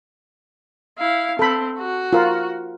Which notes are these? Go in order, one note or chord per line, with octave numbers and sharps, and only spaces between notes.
E4 F5
C4 A4 B5
F#4
F4 A#4